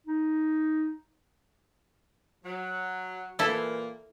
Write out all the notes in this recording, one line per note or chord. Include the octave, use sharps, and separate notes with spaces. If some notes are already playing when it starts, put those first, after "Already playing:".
D#4
F#3
A#2 E3 A#3 E4 A4